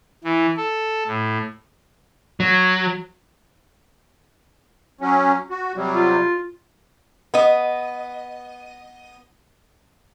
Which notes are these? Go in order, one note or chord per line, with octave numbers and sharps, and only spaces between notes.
E3
A4
A2
F#3
F#3 C#4
F#4
C3 F#3 G3
F4
B3 D#5